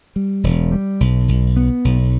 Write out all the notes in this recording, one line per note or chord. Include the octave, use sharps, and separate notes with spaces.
G3
E1
G3
B1
B1
B3
B1